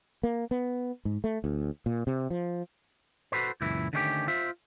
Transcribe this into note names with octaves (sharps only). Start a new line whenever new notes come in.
A#3
B3
G#2
A3
D2
A#2
C3
F3
F#4 A4 B4 C5
C#2 F#2 A#2 E3 E4
D3 D#3 A3 C#4 F4 G4
F4 C5 E5